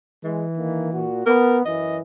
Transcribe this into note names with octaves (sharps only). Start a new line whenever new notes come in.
E3 G#3
D#3 A#3
A#2 F#4
B3 A#4
F#2 E3 D#5